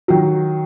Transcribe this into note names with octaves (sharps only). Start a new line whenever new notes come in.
D#3 F#3